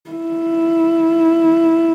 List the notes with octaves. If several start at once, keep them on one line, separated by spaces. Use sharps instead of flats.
E4